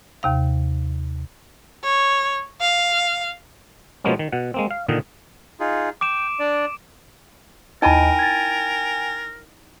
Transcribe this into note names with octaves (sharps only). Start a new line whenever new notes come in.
D#2 C3 F5
C#5
F5
B2 F3 G#3 A#3 B3 C#4
D#3
B2 F#5
G#3 A#3 C4
F5
A#2 D3 D#3 D#5
D#4 F4 G#4
G5 D6 D7 E7
D4 D5
D#2 D#4 E4 A#4 D#5 G5 G#5 B5
G#6 A6